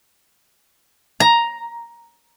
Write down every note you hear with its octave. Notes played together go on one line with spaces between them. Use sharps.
A#5